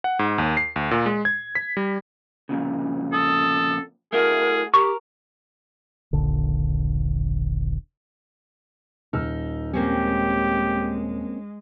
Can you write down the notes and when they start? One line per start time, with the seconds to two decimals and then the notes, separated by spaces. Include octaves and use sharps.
0.04 F#5
0.19 G#2
0.38 D#2
0.57 C7
0.76 D2
0.91 A#2
1.06 G#3
1.25 G#6
1.55 B6
1.77 G3
2.49 F2 A#2 C#3
3.12 A4 D#6
4.13 A3 E4 F#4 G#4 A#4
4.74 G4 A#4 C#6
6.13 D#1 A#1 D3
9.13 D#1 D#4 E6 F6
9.73 G#3 A#3 C4 C#4 G4